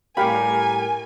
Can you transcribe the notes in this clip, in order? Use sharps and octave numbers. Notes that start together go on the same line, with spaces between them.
A2 G3 G4 A#4 F5 G5 G#5 B5